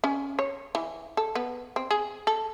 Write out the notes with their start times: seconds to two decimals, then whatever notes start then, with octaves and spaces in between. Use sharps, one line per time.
0.04 C#4
0.39 C#5
0.75 E3
1.17 A4
1.35 B3
1.76 C4
1.91 G#4
2.27 A4